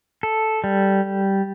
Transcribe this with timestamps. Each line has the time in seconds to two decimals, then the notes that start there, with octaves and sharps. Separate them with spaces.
0.23 A4
0.64 G3